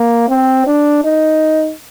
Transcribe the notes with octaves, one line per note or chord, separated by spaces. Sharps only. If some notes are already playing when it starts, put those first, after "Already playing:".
Already playing: A#3
C4
D4
D#4